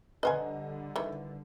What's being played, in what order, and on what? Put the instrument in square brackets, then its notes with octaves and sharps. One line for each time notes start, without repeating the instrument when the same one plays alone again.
[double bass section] D3 G3 [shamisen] B4 C5 G#5 [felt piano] D#5 F#5 A#5
[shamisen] D#3 E3